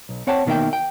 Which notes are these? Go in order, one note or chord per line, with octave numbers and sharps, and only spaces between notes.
B1
C4 C#5 F#5 G5 A5
B2 D#3 A#3 E4 E5 G5
G5